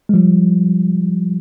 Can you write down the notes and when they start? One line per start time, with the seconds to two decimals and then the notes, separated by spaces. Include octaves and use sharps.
0.09 G#3
0.14 F3 G3